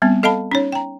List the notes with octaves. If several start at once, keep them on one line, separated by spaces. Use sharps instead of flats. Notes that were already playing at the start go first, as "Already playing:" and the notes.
G3 B3 C4
A4 D#5 F5 A5 B5
C#4 D#4 C#5
G5 A#5